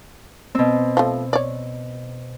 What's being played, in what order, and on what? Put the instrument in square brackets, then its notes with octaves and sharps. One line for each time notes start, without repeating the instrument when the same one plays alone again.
[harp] B2 C4
[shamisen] F3 A3
C#5 D5